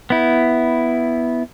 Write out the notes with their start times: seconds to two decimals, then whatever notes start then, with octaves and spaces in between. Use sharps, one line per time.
0.10 B3 E4